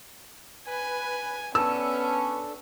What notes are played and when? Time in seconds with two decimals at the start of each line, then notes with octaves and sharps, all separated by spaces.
0.68 B4 G#5
1.55 B3 C#4 D4 A4 E6